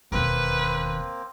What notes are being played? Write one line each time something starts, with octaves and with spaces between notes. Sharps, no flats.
E1 D#2 A#3 C4 B4